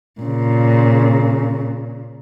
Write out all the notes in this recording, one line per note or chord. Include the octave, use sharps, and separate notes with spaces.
A#2 C#3